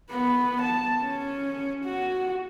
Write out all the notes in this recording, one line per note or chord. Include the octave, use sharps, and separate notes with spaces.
B3 B4
A5
C#4
F#4